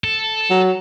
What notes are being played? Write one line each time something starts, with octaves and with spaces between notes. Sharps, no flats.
A4
F#3